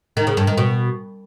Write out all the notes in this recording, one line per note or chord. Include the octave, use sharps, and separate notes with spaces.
D#3
C#3
G2
D#3
B2